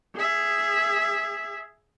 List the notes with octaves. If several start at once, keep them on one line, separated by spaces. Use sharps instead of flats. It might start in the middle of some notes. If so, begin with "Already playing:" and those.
G#4 E5